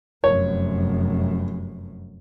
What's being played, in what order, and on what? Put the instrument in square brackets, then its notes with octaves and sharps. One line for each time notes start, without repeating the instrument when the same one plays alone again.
[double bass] F1 F#2 [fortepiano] C#5